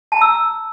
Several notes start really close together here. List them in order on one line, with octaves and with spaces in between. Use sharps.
A5 A#5 E6